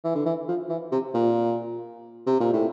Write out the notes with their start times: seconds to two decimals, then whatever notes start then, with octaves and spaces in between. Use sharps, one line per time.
0.04 E3
0.15 D3
0.26 E3
0.48 F3
0.69 E3
0.92 C3
1.14 A#2
2.26 C3
2.40 A#2
2.53 A2